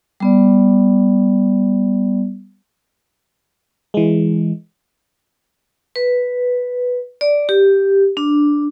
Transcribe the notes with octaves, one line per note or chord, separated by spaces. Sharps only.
G3 B3 D5
E3 G#3
B4
D5
G4
D4